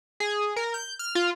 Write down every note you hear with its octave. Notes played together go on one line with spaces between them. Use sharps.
G#4
A#4
G6
F6
F4